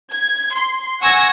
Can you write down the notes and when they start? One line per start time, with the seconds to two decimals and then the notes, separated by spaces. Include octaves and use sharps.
0.11 G#6
0.55 C6
1.01 F#5 G#5 C#6 E6 G#6 A#6